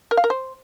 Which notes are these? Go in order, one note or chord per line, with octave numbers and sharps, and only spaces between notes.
A#4
F5
A#4
C5